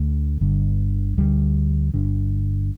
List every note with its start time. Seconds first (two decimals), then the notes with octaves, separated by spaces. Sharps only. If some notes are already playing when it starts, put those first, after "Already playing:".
Already playing: D2 D3 A3
0.41 G1 G2 D3
1.17 D2 D3 G3
1.94 G1 G2 D3